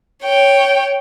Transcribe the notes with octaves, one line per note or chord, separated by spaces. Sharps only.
C#5 G5